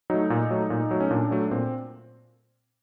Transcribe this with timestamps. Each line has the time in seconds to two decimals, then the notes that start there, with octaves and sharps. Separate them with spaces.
0.10 F#3 A3 D#4
0.30 A#2
0.50 F#3 A3
0.70 A#2
0.91 F#3 A3
1.00 C#4
1.11 A#2 D4
1.31 F#3 A3
1.51 A#2 C4